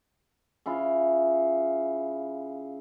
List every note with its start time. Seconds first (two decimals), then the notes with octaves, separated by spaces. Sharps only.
0.66 C#3 E4 F4